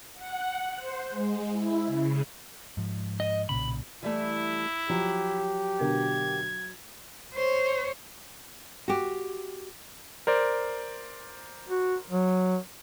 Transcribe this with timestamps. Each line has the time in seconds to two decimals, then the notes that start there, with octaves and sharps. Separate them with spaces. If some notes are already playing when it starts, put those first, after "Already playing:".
0.14 F#5
0.77 C5
1.09 G#3
1.51 E4
1.86 C#3
2.77 G#2 F3
3.20 D#5
3.49 B1 A#2 C#3 B5
4.03 E3 G3 A3 E4
4.90 F3 F#3 G4
5.80 B2 D3 A#4 G#6
7.34 C5 C#5
8.88 F#4 G4
10.27 A#4 C5 D5
11.68 F#4
12.10 F#3